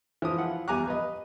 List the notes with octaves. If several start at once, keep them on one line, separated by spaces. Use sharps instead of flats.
E3 F3 D#6
E4 F4 F#5
E2 G3 G#5 A#5 D6 F#6
B4 D#5